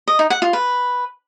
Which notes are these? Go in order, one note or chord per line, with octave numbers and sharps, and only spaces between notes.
D#5
D#4
F#5
F4
B4